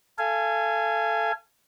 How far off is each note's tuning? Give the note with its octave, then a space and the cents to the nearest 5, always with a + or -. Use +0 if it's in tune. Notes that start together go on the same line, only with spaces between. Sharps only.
A4 +0 F5 -35 G#5 +0